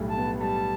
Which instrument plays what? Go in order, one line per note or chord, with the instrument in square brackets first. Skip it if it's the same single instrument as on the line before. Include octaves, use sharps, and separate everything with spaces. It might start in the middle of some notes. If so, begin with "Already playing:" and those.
Already playing: [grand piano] B1 A2 G3
[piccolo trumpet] A5
[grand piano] B3
[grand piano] G3 [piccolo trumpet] A5